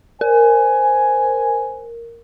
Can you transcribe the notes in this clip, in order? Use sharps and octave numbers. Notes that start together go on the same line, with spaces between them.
A#4 C5 G#5